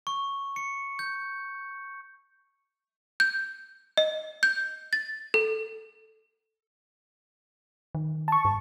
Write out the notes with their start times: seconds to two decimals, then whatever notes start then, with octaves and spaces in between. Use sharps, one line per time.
0.07 C#6
0.56 C#7
0.99 G6
3.20 G6
3.97 D#5
4.43 G6
4.93 A6
5.34 A4
7.95 D#3
8.28 A5 C#6
8.45 G2